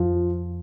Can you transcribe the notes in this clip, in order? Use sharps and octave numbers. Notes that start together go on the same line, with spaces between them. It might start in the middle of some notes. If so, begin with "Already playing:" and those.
Already playing: F2 F3